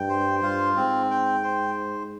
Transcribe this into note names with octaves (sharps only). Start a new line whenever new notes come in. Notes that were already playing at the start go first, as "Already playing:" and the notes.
Already playing: G2 G5
C5
G2 F4
G#2 C4
G5
C5